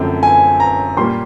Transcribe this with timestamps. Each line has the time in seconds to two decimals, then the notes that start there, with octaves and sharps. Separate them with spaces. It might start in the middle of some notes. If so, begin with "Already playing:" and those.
Already playing: F#2 D3 F3 A3 C4
0.23 G#5
0.60 A#5
0.97 A#2 G3 A#3 C6